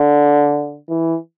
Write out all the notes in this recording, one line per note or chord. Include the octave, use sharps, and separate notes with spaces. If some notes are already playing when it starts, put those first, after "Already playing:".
Already playing: D3
E3